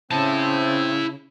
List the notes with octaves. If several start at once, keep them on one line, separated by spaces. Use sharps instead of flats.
C#3 C4 E4 C5 E5 A5